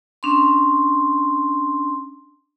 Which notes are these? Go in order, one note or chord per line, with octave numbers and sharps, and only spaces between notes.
C#4 D4 C6